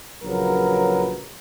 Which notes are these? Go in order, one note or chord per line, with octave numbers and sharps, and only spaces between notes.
A#1 C#3 F#3 A#4 B4